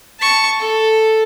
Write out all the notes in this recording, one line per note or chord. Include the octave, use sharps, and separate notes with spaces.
A5 C#6
A4